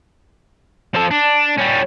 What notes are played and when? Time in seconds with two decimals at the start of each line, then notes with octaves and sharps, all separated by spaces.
0.94 F3 A4
1.11 D4
1.58 G3 C#4